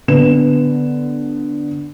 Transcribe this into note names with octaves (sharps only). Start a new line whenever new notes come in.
D3 B3 E7